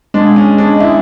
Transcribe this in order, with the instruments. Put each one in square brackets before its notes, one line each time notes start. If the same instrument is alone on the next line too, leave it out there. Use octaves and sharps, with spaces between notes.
[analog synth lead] G#3 [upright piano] D4
[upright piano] C#4
D4
E4